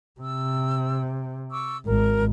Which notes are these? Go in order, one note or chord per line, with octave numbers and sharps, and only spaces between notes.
C3 E6
C#6 D6 E6
G#1 A#4